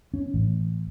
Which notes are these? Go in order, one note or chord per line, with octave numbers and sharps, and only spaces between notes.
C#4
A1